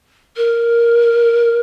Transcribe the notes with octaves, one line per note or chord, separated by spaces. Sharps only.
A#4